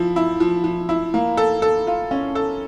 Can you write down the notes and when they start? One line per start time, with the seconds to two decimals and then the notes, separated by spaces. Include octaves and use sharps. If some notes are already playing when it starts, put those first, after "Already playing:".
Already playing: F3 E4
0.16 E4
0.40 F3
0.64 F3
0.89 E4
1.14 A#3
1.37 A4
1.62 A4
1.87 F4
2.11 C#4
2.35 A4